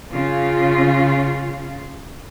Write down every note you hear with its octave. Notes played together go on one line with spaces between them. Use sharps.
C#3 F4